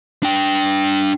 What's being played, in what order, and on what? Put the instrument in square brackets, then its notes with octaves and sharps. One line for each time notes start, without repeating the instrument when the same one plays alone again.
[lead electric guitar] D4 G5